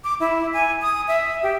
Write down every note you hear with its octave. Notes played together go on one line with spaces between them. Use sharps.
D6
E4
G#5
D#6
E5
G4